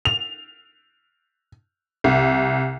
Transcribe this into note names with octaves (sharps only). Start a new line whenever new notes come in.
F7
C2